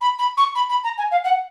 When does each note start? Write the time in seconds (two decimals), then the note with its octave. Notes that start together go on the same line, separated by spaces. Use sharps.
0.01 B5
0.18 B5
0.37 C#6
0.55 B5
0.69 B5
0.83 A#5
0.97 G#5
1.11 F5
1.24 F#5